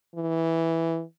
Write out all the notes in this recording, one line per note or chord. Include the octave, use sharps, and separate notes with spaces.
E3